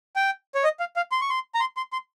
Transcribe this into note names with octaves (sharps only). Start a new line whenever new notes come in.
G5
C#5
D#5
F5
F5
C6
C#6
C6
A#5
C6
C6
C6